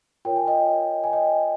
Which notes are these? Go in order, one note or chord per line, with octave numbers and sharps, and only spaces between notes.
F4 A#4 C#5 G5
G#5
D#5 G5
G#5
D#5 G5